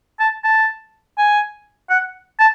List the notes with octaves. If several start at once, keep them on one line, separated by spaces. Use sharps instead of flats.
A5
A5
G#5
F#5
A5